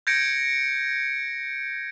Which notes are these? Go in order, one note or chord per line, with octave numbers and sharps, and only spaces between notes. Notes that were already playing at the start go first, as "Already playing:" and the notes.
G6 G#6 A#6 C#7 D7